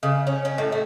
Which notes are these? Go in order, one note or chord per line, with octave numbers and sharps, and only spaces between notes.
C#3
C#4
C#4
A2
A3